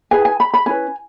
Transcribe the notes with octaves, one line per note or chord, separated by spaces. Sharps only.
E4 G#4 B4 G#5
G#5
B5
B5
C#4 E4 B4 G#5